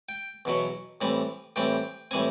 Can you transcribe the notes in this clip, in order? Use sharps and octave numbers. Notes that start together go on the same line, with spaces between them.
G5
E2 B2 F#3
A2 E3 G3 C4
A2 E3 G3 C4 G5
A2 E3 G3 C4 G#5